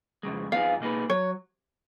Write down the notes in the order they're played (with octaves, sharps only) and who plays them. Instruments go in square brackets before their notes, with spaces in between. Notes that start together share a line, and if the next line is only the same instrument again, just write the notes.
[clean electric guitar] F2 C#3 G#3
[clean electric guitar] F2 F3 B3 D#4 G#4 [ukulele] F5
[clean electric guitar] B2 A#3 D#4 G#4 B4
[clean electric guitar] F#3 [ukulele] C#5